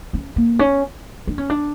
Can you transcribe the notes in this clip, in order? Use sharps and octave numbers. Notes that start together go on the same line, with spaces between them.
C#4
A#3
C#4
D4
C#4
D4